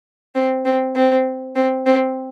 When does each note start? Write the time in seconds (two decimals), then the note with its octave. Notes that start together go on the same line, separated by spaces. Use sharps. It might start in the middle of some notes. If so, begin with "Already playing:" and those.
0.35 C4
0.65 C4
0.95 C4
1.56 C4
1.86 C4